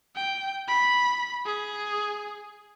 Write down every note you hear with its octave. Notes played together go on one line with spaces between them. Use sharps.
G5
B5
G#4